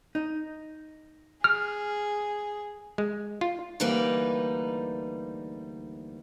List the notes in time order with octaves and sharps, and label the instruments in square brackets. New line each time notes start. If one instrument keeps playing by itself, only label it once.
[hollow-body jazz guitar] D#4
[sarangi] G#4 [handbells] F6
[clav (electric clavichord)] G#3
F4
[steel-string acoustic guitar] D2 E3 G3 A#3 D#4 B4